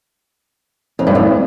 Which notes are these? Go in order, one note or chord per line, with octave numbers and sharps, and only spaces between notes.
F2
G2
F2